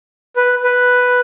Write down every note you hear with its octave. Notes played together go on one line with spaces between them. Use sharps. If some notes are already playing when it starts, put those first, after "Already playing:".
B4
B4